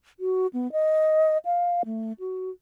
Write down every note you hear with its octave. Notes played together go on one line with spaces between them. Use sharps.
F#4
B3
D#5
F5
A3
F#4